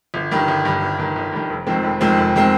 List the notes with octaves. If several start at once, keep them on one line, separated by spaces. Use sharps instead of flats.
G1
G2 D#3
G1
G2 D#3
G1
G2 D#3
G1
G2 D#3
F1
F2 D#3 G#3 C4
F1
F2 D#3 G#3 C4
F1
D#3 G#3 C4